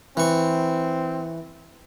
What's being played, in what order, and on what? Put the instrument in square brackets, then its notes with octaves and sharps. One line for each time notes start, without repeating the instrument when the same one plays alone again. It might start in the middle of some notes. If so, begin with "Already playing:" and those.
[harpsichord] E3 C#6 [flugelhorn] C4